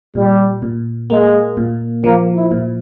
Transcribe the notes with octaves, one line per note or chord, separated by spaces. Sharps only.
A#2 G3
A#2
G#3 A#3
A#2
F3 A#3
E4
A#2